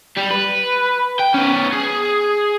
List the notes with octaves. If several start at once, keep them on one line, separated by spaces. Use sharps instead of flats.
G3
B4
G5
B3 C#4
G#4